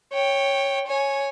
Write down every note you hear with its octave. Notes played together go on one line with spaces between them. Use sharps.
C#5 G5
C#5 G#5